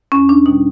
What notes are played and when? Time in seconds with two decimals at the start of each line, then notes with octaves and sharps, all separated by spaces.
0.12 E2 C#4
0.29 D4
0.46 B2 G3 D#4